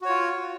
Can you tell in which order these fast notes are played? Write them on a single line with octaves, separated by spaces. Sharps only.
F#4 C#5 F4